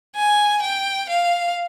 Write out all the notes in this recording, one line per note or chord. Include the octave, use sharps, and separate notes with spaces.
G#5
G5
F5